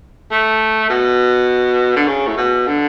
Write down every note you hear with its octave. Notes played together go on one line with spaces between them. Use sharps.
A3
B2
D3
C#3
A2
B2
D3